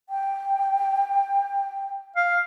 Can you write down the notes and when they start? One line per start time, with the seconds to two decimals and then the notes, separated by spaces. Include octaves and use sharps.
0.09 G5
2.16 F5